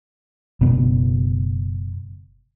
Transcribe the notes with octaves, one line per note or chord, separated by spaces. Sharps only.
F#1 B2 B3